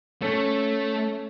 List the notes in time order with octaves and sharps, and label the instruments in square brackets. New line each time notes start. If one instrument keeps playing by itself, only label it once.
[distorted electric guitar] A3 [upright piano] C#4 A4 C#5